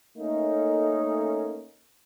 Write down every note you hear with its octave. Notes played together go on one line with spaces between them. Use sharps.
A3 A#3 C#4 D#4